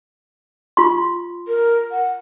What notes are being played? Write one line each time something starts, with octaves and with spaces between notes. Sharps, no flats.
F4 C6
A#4
F#5